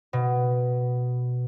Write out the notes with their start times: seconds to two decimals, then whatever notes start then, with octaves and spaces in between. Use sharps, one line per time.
0.13 B2